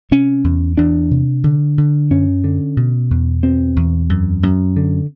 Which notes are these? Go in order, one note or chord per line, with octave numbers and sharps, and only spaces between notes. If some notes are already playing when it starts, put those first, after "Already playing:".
C3 C#4
E2
E2 D4
C3
D3
D3
F#2 C#4
D3
B2
E2
B2 C4
E2
F#2
F#2
D3